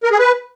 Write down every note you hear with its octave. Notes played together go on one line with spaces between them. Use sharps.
A#4
G#4
B4